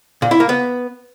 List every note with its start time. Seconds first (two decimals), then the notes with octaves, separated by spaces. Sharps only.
0.22 A#2
0.31 E4
0.40 A#3
0.49 B3